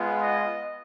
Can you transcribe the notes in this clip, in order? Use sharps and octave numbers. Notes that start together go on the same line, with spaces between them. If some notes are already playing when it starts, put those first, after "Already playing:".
Already playing: G#3 B3 F4
D#5